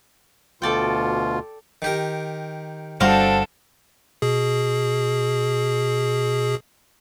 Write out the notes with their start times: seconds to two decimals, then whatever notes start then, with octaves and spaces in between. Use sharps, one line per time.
0.62 D2 B2 F4 A4 D5 G5
1.82 D#3 G4 A#4
3.01 G1 G3 C4 D4 F#4 A4 C5 F5
4.22 B2 G#4